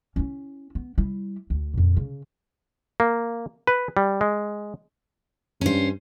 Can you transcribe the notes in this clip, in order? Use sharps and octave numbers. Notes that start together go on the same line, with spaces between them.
C#4 E4
B3
G3 E4
D2
F2 A#2
C#3
A#3
B4
G3
G#3
G2 C#4 C5